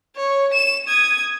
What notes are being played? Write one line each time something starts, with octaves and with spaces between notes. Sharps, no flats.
C#5
E7
D#6 G#6